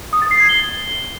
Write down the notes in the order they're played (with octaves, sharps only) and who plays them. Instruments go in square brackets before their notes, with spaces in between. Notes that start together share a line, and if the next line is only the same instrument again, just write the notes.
[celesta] D#6
A6
C7
G#6
G7